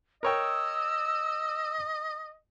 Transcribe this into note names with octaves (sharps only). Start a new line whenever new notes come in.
A#4 C#5 D#5 G5 E6